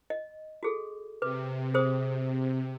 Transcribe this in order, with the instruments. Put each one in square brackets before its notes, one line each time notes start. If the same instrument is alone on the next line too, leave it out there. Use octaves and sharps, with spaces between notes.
[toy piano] D#5
F#4 G#4 A4
[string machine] C3 [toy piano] B4 D6
[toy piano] G#4 C5 D#6